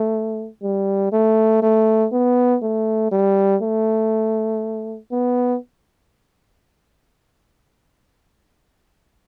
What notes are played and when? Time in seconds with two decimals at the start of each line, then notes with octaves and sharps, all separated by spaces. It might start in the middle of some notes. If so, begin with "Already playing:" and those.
Already playing: A3
0.63 G3
1.13 A3
1.62 A3
2.12 B3
2.62 A3
3.11 G3
3.62 A3
5.12 B3